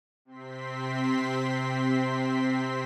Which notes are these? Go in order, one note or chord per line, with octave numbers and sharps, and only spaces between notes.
C3 C4 C6 B6